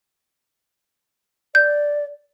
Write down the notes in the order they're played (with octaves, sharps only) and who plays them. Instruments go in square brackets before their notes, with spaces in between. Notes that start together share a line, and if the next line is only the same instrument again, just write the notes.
[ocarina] D5 [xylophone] G6